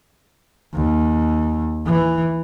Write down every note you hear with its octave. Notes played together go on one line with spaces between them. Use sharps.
D#2
E3